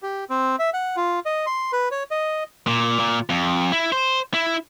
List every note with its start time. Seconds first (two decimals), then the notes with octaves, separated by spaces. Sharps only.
0.03 G4
0.30 C4
0.59 E5
0.74 F#5
0.96 F4
1.26 D#5
1.46 C6
1.73 B4
1.91 C#5
2.11 D#5
2.67 A#2
2.99 A#2
3.30 F2
3.72 E4
3.92 C5
4.34 E4